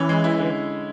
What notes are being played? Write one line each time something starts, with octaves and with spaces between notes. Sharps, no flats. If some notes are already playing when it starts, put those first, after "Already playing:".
Already playing: E3 C#4
G#3
E4
D3